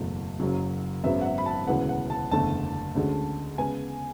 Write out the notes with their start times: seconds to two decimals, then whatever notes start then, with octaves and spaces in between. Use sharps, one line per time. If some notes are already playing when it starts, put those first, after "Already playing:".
Already playing: F#1 E2 B2 F#3 A3
0.40 F#1 F#2 C#3 F#3
1.04 G#1 F#2 C#3 F#3 B3 E5
1.21 F#5
1.25 E5
1.38 B5
1.46 A5
1.67 E1 D2 C#3 E3 B3 F#5
1.89 F#5
2.10 A5
2.31 F#1 E2 D3 A3 A5
2.95 D2 D3 G#3 C#4
3.58 C#3 G#3 B3 G#5